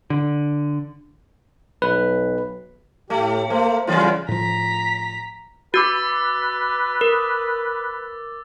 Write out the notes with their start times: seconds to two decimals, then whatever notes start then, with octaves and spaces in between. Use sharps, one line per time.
0.10 D3
1.82 B1 B4
3.10 A2 A3 G4
3.50 A3 A#3 C5
3.87 E2 C#3 E3 G3 C#4 F4
4.28 A2 F3 A#5 B6
5.74 F#4 B4 D6 E6 A6
7.01 A#4